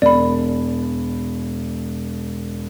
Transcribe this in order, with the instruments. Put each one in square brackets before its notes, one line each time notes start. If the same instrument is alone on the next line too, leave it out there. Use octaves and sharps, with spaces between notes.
[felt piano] E1 [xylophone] D5 B5